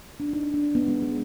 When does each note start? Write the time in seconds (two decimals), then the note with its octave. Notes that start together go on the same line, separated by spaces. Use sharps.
0.20 D4
0.33 D#4
0.54 D4
0.75 B3
0.88 G#3
1.02 G#3